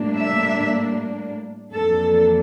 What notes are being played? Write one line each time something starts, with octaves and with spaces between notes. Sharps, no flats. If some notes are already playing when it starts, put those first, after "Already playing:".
Already playing: A2 G3 A#3 D4
E5
F2 E3 A#3 D4 A4